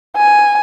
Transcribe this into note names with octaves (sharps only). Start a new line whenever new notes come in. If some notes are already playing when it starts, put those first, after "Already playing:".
G#5